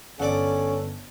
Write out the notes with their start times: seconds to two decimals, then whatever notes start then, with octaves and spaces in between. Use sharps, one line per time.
0.20 G1 C#4 A4 D5 F#5